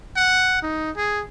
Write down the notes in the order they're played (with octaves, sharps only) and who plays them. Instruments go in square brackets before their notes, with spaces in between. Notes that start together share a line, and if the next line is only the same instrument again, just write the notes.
[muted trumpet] F#5
D#4
G#4